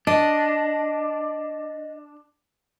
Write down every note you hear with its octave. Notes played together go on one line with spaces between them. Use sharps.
D4 D#5